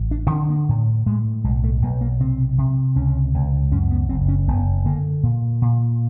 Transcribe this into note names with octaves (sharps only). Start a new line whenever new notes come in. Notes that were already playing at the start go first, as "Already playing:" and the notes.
Already playing: A1
D4
D3 C#4
A#3
A2
A2 G#3
B1 G#3
A3
B1 A#3
A#3
C3 C4
C3
C#2 C#4
C#2
F#2 C#4
B3
F#1 C4
C#4
F#1 B3
D3 A#3
A#2
A#2